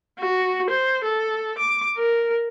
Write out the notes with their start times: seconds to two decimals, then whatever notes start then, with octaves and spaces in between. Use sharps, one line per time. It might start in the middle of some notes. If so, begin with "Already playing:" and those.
0.20 F#4
0.70 C5
1.04 A4
1.58 D6
1.97 A#4